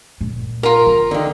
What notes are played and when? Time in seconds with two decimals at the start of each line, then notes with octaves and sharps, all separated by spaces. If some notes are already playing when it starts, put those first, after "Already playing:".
0.21 A#2
0.63 F4 A#4 A#5
0.87 B3
1.11 D3 D#3